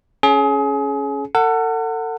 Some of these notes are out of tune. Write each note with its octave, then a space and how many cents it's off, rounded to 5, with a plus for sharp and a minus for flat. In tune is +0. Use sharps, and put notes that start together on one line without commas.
C#4 +0 G#4 +30
A4 +40 F#5 +0